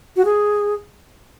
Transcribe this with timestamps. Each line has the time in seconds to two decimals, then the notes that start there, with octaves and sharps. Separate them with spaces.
0.17 F#4
0.25 G#4